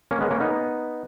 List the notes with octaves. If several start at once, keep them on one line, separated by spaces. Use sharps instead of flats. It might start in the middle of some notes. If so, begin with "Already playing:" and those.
A#3 C#4
G#3 B3
A#3 C#4
B3 D#4